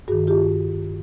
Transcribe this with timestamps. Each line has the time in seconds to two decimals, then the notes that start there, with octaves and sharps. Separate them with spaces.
0.08 G2 D#3 F#4 G#4
0.27 F4 G4